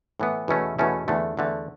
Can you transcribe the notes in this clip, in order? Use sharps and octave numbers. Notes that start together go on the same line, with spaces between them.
A2 E3 B3
E2 B2 A3 C#4 E4
E2 B2 A3 C#4 E4
E2 D3 A3
E2 D3 A3